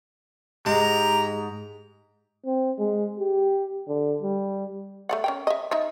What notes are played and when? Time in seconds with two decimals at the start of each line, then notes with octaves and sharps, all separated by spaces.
0.66 G#2 G#3 G4 A#5
2.46 C4
2.78 G#3
3.19 G4
3.87 D3
4.22 G3
5.09 A3 D5 F#5
5.24 C#4 A#4 G5
5.47 D#5 E5
5.71 D#4 D#5 E5